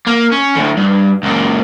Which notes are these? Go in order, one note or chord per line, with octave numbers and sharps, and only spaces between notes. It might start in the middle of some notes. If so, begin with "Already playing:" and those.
A#3
C#4
D2 A2
G2
C#2 A#2